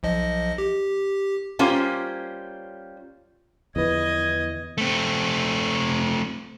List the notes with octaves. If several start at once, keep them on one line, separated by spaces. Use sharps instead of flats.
B1 F3 D#5
G4
G3 A#3 C#4 F4 C5
E2 D3 F3 B4 D#5 G#6
A3 C4